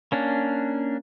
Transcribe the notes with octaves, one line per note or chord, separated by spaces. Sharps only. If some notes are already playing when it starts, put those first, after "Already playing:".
A#3 C#4 D4